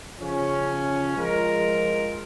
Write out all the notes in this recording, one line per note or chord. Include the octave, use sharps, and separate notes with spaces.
C#3 F3 C#4
F3 G#3 F4 A#4